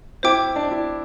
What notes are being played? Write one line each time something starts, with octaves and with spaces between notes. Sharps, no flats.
E4 C5 G5 D6
D4
E4